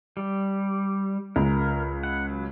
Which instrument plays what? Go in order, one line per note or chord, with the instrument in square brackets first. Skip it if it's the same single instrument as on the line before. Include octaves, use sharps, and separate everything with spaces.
[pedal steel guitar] G3
[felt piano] C#2 [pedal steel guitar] A#4
[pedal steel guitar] F#5
F#3